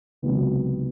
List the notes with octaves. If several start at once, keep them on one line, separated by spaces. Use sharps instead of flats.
C#2 C3 D#3 F#3 B3